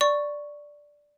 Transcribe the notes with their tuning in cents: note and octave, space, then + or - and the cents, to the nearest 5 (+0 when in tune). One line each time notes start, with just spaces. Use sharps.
D5 +0 C#6 +0